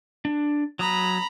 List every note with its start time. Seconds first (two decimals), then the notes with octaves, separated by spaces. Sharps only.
0.25 D4
0.79 F#3 A#5 B5 D#6